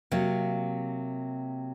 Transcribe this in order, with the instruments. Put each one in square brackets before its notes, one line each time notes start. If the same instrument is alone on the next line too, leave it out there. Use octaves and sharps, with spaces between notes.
[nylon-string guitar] C3 F#3 A#3